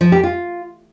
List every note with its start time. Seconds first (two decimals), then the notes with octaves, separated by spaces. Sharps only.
0.01 F3
0.12 G4
0.23 F4